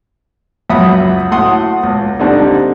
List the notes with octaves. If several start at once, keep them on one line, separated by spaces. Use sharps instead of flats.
C#2 F#2 E5 F#5 B5 D#6
A2 A3 F#4 F#5 C6 D#6
C#2
D3 G3 C4 D4 D#4